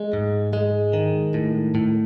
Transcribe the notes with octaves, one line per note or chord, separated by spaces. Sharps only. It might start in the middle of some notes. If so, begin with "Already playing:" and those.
Already playing: G#3
G#2
G#3
D#3
A2
A2